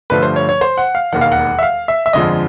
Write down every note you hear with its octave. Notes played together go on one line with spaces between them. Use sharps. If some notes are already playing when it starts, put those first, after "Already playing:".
G2 D3 F3 A3 B4
C5
C#5
C#5
C5
F#5
F5
E1 D#2 D#3 F#5
F5
F#5
E5
F5
E5
E5
G1 F2 D3 F3 G#3 D#5